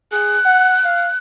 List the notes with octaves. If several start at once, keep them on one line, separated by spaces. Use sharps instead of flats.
G#4 F#6
F#5
F5